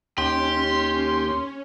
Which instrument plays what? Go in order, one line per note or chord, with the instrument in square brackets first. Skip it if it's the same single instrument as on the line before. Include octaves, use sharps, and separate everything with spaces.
[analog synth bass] D#2 [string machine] C#4 [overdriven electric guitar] G4 [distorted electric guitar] C6